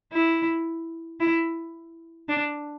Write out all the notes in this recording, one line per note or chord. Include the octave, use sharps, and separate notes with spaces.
E4
E4
D4